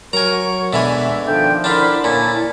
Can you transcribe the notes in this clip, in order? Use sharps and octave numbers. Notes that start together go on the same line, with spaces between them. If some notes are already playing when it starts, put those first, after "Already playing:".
F#3 A#4 C#5 G#5 A#5
B2 D3 E3 G#3 E5 G#5
D#3 F3 D4 A4 E5 G5
D3 D4 E4 A#4 C5 B5
A#2 D3 C#4 E4 A5